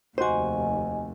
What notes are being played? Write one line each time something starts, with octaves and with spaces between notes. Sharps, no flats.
F1 D#2 F#4 C5 D#5 G#5